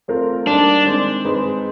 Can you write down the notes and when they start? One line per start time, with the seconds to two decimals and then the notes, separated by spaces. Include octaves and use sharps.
0.08 A3 C4 F4 A#4
0.47 G3 A#3 D4 D#4
0.85 D#3 G#3 C4
1.25 G#3 C4 D#4 G#4 B4